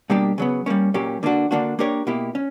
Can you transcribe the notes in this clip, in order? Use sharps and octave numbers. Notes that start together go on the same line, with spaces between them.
B2 G3 A#3 D4 G4
C#3 F#3 B3
G3 A#3 C#4
A#2 F#3 A#3 C#4 G4
D3 A#3 D4 F#4
D3 A#3 D4 F#4
A#3 D4 G4 A#4 C#5
B2 A#3 E4 G4
C#4